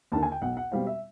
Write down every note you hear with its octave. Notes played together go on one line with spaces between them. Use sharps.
D#2 D3 A5
G#5
G5
B1 F#5
F#5
B2 G3 C4 F5
E5